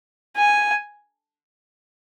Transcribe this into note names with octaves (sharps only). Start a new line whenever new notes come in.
G#5